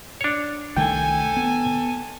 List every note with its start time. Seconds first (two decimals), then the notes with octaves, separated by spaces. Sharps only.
0.21 D4 C#5
0.77 C2 D#3 A3 A4 G5 G#5
1.37 B3